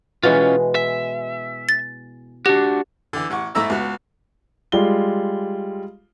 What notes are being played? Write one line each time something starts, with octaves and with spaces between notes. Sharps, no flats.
B2 E3 G#3 C#4 F4
E5
A6
D4 F#4 G4
D3 E3
A1 F#5 C#6
G#2 A3 E4 A#5 E6
C#2 B3 F#4
G3 G#3 F4 G7